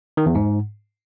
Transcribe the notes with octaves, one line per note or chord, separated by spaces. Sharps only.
D#3
E2
G#2